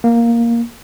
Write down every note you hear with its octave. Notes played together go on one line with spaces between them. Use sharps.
A#3